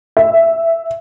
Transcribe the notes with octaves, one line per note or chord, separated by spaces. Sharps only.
E5